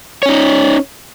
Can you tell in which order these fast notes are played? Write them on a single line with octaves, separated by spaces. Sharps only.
C#5 C#4 D#4